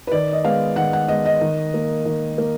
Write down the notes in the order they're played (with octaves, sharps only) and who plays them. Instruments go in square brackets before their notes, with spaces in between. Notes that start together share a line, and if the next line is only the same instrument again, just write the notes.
[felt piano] B4
D#3 D5
D#5
G#3 B3 F5
D#3 F#5
F#5
G#3 B3 D#5
D#5
D#3
A#3
D#3
A#3